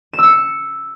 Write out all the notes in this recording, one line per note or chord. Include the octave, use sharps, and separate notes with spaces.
E7
E6
C#7